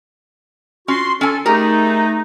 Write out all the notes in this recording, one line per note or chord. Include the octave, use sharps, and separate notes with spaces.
C#4 F4 F#4 C6
C#4 A4 G#5
A3 D#4 G4 G#4 A#4